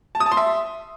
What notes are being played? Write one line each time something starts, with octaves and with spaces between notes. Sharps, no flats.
A5
D#6
A5
C6
E5